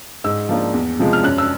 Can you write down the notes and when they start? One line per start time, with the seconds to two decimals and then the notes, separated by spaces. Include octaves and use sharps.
0.24 G#2 E6
0.49 F3 A#3 D4
0.74 E2
0.99 C3 F3 G#3
1.13 F6
1.23 F#2 F#6
1.38 E6